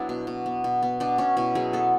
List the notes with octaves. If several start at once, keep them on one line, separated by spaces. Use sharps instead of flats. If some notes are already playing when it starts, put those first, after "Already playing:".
Already playing: F#3 B3 D4 E4
B2
B2
B3
B2
B3
B2 D4
B2 C#4
B2 E4
F#3 G#4
B3 A4